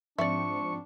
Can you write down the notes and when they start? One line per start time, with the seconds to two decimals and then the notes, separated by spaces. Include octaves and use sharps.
0.18 G#2 F3 C4 D4 D5 E5 C#6